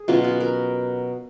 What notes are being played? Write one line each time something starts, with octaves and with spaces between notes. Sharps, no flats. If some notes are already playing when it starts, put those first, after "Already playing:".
Already playing: G#4
B2 F#3 C#4 F4
F#4
A#4